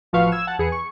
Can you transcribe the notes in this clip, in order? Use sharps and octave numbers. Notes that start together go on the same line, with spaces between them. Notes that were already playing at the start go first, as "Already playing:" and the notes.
A1 F3 F#4 B4 F5 C#6
E6 G#6 E7
F#5 A5
E2 G#4 B4 C#7
C#6